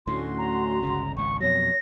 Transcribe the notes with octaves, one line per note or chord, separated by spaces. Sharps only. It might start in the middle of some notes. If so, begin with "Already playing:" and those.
D2 A2 C#4 F#4 C6
A#5
G1 C#2 C#3
G#1 C#2 C#6
F2 B2 F#3 C#5 A#6